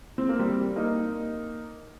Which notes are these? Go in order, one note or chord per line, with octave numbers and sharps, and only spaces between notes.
C4
A#3
G3 C4
A#3 D#4